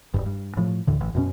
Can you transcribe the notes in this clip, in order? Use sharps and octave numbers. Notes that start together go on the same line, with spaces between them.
E1 B1 G2
G2
A2 F3
D2 A2 D3
A1
F#2 B2 C#4